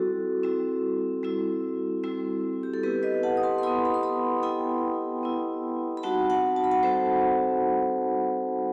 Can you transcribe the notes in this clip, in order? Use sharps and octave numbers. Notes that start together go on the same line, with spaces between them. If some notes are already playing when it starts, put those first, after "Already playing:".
Already playing: G3 C4 E4 F#4 A4
G3 C4 E4
G3 C4 E4
G3 C4 E4
G4
A4
B3 E4 G4 B4
B4 D#5
F#5 A5
D#6
A5 C6
C6
B3 E4 B5 D#6
B5
C6
B5 D#6
B3 E4 G5 B5
B3 E4
B5
G3 C4 D#4 F#4 F#5 A5
F#5 A5
A5
B5
F#5 A5
G3 C4 D#4 F#4 A4 C5